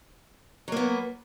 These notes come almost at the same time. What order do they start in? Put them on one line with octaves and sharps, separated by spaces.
F#3 A#3 B3